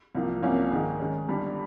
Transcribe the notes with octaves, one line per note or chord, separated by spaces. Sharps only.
C2 C3 F3 A#3
C2 C3 F3 A#3 C#4
G#2 D#3 G#3
D#3 G#3 C#4
G1 G2 G3